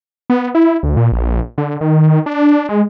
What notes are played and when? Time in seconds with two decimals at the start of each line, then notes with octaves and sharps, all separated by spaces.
0.30 B3
0.55 E4
0.83 D2
0.97 A#2
1.12 A#1
1.58 D3
1.81 D#3
2.26 D4
2.69 G#3